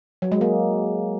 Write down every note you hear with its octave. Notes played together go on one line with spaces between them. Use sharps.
F#3
G#3
A#3